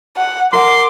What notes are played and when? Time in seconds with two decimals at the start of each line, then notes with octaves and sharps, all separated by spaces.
0.17 F#5
0.53 A#4 F#5 C6 D6